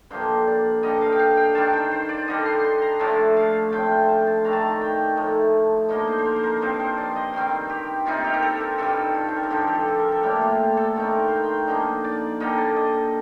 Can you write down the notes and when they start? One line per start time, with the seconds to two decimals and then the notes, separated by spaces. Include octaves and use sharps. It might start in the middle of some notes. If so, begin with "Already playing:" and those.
0.11 G2 D3 F3 A#3 C5
0.47 D5
0.83 G2 D3 G3 D#5
1.01 F5
1.12 G5
1.19 F5
1.37 G5
1.55 D#3 G3 D4 A5
1.73 G5
1.91 C5
2.09 D5
2.28 D3 G3 D4 D#5
2.46 C6
2.64 C6
2.82 A#5
3.00 A2 F3 A3 D4 A5
3.37 F5
3.72 A2 F3 C4 G5
3.90 G5
4.09 A5
4.27 A5
4.45 D#3 A3 D4 A#5
4.53 A5
4.61 A#5
4.81 G5
5.16 A2 F3 A3 D#4
5.89 D3 F3 A#3 D#4 D#5
6.07 C5
6.19 C5
6.25 A#4
6.36 C5
6.43 A#4
6.61 G2 F3 C4 C5
6.80 C5
6.98 D5
7.16 D#5
7.34 D#3 G3 C4
7.70 G4
8.06 C3 G3 C4 D#4 F4
8.24 G4
8.34 A#4
8.42 A4
8.61 A#4
8.78 G2 D#3 G3 A4
9.15 F4
9.28 C5
9.36 A#4
9.43 A4
9.50 G2 D3 F3 G4
9.68 G4
9.75 A4
9.88 A4
9.99 A#4
10.12 A4
10.23 A2 G3 A#3 D4 G4
10.36 G4
10.41 F4
10.60 G4
10.77 A4
10.96 D3 A3 C4 D#4 A#4
11.19 A#4
11.28 C5
11.36 A#4
11.43 G5
11.68 D3 F3 A#3 D#4 D#5
12.04 D5
12.40 D3 G3 A#3 D#5
12.58 D5
12.76 D#5